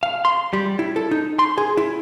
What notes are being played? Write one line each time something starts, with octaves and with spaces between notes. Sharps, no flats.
F5
C6
G3
E4
A4
D#4
C6
G#4
E4